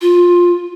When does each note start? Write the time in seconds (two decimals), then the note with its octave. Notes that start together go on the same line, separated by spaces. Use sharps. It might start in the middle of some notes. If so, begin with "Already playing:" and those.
0.01 F4